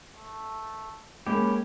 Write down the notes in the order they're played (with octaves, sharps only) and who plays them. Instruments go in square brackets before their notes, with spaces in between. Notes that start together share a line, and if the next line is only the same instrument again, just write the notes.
[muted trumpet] A3
[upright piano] G#3 A#3 [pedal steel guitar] C#4 G4 [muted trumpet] B4